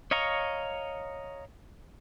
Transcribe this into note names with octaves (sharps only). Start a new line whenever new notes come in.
C#5 D#5 F5 A#5 C#6